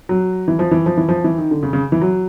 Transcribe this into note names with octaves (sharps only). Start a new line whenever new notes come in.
F#3
E3
F3
E3
F3
E3
F3
E3
D#3
D3
C#3
C#3
E3
F#3